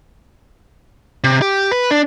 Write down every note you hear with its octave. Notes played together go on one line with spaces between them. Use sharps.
C3
G4
B4
D4